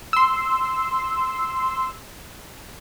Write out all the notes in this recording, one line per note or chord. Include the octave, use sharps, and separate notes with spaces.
C6 E6